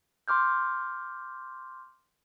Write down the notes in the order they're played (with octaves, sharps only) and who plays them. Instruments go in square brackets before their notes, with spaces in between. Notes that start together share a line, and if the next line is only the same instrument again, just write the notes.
[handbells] C6 D6 F6 G6